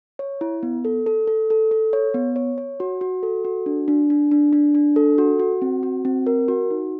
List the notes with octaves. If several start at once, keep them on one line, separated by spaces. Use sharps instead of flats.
C#5
E4
B3
A4
A4
A4
A4
A4
C#5
B3
C#5
C#5
F#4
F#4
A4
F#4
D4
D4
D4
D4
D4
D4
A4
F#4
F#4
C4
F#4
C4
A#4
F#4
D#4